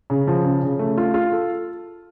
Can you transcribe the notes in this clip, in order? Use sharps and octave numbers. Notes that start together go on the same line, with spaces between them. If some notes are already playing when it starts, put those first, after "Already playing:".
C#3
F3
C#3
C#3
A3
F4
F4
A4